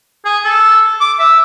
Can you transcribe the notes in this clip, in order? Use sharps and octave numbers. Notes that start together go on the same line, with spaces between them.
G#4
A4
D6
E5